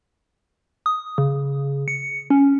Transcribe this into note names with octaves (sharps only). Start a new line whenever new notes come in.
D#6
C#3
C#7
C#4